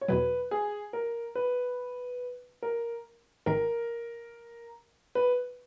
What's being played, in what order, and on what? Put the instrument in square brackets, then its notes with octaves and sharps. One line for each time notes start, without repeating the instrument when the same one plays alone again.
[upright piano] C#5
[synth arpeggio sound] E2 B2 F#3 [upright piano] B4
[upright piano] G#4
A#4
B4
A#4
[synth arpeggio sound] G#1 G#2 D#3 [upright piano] A#4
[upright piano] B4